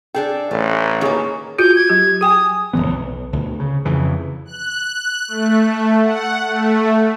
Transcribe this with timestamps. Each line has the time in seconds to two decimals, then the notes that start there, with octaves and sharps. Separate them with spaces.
0.15 D4 G#4 A4 G5
0.51 A1 A3
1.01 D#3 A#3 G#4 C#5
1.59 F4 F#4 G#4 G6
1.76 G#6
1.89 F#3 G4
2.21 G#4 G5 G#5 D#6
2.73 D#1 F2 E3 B3
2.90 B1
3.33 D2 B2
3.60 C#3
3.85 F2 C#3 E3
4.45 F#6
5.28 A3
6.03 F#5
6.47 A3